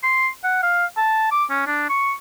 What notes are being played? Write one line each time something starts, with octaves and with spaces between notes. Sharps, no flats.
C6
F#5
F5
A5
D6
C#4
D4
C#6